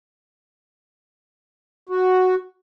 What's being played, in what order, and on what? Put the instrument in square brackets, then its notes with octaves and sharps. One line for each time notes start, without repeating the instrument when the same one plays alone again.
[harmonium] F#4